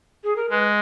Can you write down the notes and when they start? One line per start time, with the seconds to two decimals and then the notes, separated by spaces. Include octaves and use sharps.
0.24 G#4
0.36 A#4
0.50 G#3 B4